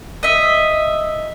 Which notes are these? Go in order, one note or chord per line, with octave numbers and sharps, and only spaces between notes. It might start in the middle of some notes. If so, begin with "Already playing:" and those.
D#5 E5